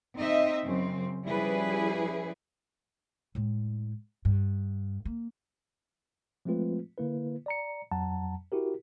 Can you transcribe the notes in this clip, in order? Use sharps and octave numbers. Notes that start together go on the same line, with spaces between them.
C4 D#4 D#5 E5
F#2 C#3 C4
F3 G3 C#4 E4 G#4 B4
A2 G#3
G2
A#3
F3 G#3 A3 C4 F4 B4
D3 A#3 E4 B4
D5 A#5 C#7
F2 F#3 F#5 A5 A#5
E4 F#4 G4 A#4